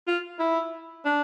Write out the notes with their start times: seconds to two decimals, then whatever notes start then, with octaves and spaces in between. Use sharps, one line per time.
0.08 F4
0.39 E4
1.05 D4